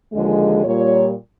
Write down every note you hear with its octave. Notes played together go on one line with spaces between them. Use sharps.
D#2 D3 F3 G#3
A#2 G3 C#5